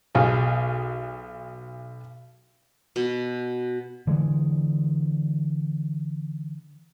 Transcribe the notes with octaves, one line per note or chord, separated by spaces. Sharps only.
B1 F4 G#4
B2
D3 E3 G#3